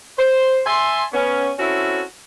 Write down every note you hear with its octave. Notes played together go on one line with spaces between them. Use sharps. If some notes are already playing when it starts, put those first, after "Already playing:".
C5
E5 G#5 A5 C6
B3 C#4
C4 C#4 E4 F#4 A4